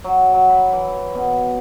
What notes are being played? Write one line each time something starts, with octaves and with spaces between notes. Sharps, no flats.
F#3
F#3
B5
E3
B2